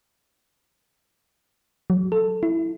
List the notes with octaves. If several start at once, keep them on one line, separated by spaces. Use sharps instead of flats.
F#3
A4
E4